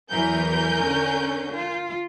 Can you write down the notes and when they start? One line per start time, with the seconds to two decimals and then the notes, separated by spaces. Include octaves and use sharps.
0.11 E2 E3 F#3 A#4 G#5 G6
0.83 D3 C#4
1.55 F4